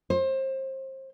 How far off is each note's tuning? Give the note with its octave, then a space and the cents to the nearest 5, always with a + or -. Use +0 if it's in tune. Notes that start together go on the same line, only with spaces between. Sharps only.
C5 +30